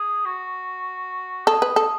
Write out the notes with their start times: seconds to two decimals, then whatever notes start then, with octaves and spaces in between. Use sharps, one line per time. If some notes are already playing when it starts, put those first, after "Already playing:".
Already playing: G#4
0.26 F#4
1.46 G#4 A4
1.62 B4
1.76 A4